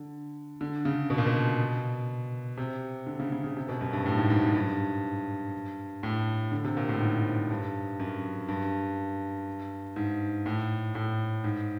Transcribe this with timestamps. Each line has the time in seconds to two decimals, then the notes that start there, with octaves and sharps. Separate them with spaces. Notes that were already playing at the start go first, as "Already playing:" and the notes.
Already playing: D3
0.61 D3
0.85 C#3
1.10 B2
1.18 A#2
1.26 B2
2.57 C3
3.07 D3
3.20 C#3
3.32 C#3
3.44 C#3
3.57 C3
3.69 B2
3.81 F#2
3.93 G2
4.06 A2
4.18 G#2
4.30 G#2
4.42 F#2
4.55 G2
6.03 A2
6.52 D3
6.64 C3
6.77 A#2
6.89 A2
7.01 G#2
7.50 G2
8.00 F#2
8.48 G2
9.96 G#2
10.46 A2
10.95 A2
11.44 G#2